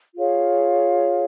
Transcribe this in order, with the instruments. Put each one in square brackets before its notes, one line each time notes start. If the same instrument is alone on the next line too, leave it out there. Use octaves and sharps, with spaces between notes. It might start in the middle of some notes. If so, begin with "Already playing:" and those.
[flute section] F4 G#4 C#5 F5